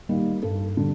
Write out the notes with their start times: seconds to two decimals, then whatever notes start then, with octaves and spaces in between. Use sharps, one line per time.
0.09 D#3 G3 A#3
0.43 G2 A4
0.77 D3 G3